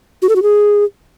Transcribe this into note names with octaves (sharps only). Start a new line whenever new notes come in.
F#4
A4
F#4
G#4